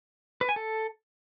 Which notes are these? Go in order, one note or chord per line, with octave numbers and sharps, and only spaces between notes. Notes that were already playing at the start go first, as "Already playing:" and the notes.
B4
G#5
A4